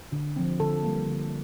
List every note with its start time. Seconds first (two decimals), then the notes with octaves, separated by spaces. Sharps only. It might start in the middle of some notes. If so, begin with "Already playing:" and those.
0.12 D3
0.36 F3 C4
0.60 D3 A4
0.83 G3 A#3
1.07 D3